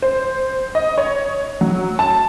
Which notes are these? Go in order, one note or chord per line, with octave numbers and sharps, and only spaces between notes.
C5
D#5
C#5
F#3
A5